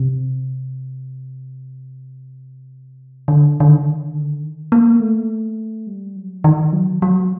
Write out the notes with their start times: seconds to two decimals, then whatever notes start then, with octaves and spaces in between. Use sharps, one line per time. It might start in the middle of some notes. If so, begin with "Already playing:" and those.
Already playing: C3
3.28 D3
3.60 D3
3.70 D#3
4.14 D3
4.43 D#3
4.72 A#3
5.00 A3
5.87 G3
6.16 F#3
6.44 D#3
6.73 F#3
7.02 F#3